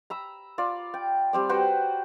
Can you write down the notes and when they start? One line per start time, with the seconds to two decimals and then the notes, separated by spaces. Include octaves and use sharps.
0.10 A#5 B5 E6
0.58 F4 D5
0.94 G5
1.33 G3 C4 D5
1.49 F#4 B4 C5 G5